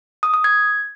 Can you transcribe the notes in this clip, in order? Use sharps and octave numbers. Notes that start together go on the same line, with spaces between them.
D#6
D#6
G#6